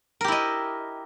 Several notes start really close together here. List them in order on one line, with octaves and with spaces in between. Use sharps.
A#4 G4 E4 D#5